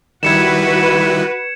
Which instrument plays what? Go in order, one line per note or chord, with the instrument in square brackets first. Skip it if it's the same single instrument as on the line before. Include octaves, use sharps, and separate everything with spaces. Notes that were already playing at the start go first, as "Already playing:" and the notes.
[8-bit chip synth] D#3 G3 E4 [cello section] F#4 B4 [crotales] G#6 C#7 E7